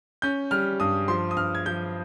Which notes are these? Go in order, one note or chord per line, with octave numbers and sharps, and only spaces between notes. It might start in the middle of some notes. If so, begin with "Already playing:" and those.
C#4 G6
G3 F6
G2 D#6
F3 C6
D#6
G2 F6
G#6
F3 G6